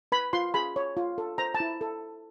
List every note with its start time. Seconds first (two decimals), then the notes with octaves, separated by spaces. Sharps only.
0.12 B4 B5
0.33 F4 C6
0.54 G#4 B5
0.76 C#5
0.97 F4
1.18 A4
1.38 C5 A#5
1.55 A5
1.60 E4
1.81 A4